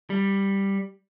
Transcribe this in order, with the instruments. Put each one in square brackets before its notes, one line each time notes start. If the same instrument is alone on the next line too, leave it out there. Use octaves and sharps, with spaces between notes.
[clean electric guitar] G3